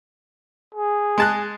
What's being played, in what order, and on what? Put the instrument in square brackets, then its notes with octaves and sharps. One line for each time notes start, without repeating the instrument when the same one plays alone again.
[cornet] G#4
[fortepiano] G#3 A5 F#6